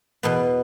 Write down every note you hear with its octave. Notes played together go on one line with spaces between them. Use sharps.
E2 B2 B3